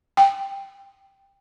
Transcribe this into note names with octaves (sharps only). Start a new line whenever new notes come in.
G5